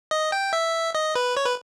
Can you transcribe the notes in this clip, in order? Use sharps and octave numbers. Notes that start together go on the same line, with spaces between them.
D#5
G5
E5
D#5
B4
C#5
B4